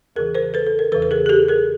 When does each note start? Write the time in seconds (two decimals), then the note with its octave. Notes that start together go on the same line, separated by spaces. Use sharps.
0.16 E2 C#3 E3 G#4 A#4
0.35 A#4 C5
0.54 A4 B4
0.66 A4
0.79 A#4
0.92 E2 C#3 E3 A4 B4
1.02 B4
1.11 G#4 A#4
1.26 G#4
1.29 G4 A4
1.49 G#4 A#4